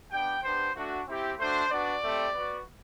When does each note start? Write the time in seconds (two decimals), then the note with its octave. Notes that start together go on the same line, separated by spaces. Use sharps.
0.11 B3 D4 G4 G5
0.43 B3 D4 G4 C5
0.75 A3 D4 F#4
1.08 C4 E4 G4
1.38 A3 D4 F#4 C5
1.71 B3 D4 F#4 D5
2.02 A3 C4 G4
2.34 B3 F#4